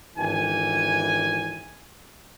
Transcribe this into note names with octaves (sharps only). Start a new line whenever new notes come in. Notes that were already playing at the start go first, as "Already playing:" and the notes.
G#1 D3 E3 G5 G#5